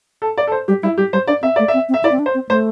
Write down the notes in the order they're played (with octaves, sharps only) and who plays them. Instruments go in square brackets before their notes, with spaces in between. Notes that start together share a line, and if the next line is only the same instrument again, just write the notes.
[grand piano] A4
D5
A4
C5
[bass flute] G3 [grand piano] G4
[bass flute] G3 [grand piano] E4
[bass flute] G3 [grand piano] G4
[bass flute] G3 [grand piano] C5
[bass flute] D4 [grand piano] D5
[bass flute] C4 [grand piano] E5
[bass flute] A3 [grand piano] D5
[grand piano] E5
[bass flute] C4
C4
[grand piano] E5
[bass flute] E4 [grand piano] D5
[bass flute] C4
D4
[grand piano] C5
[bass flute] C4
[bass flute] A3 [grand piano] C5